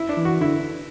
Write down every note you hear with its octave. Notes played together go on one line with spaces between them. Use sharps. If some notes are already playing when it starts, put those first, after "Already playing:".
Already playing: E4
D4
E3
F#4
D3 E4